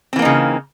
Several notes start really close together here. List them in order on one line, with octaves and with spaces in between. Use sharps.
C4 E3 A#3 D#4 C#3